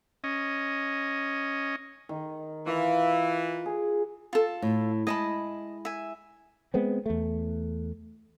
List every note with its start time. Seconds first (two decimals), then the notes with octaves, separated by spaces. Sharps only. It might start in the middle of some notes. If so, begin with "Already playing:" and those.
0.24 C#4 D#5
2.09 D#3
2.67 E3 F4
3.66 G#4
4.33 F4 A4
4.62 A2
5.07 G#3 E4 G#4 D#5 A5 B5
5.85 E5 G#5
6.74 G#3 B3 C4
7.06 E2 A3